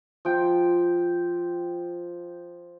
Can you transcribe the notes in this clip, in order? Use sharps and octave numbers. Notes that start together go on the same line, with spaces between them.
F3 G5